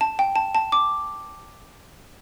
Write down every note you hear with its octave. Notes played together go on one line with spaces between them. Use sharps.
A5
G5
A5
A5
D6